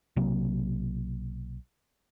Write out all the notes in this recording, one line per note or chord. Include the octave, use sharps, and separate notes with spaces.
B1 C3 F#3 A#3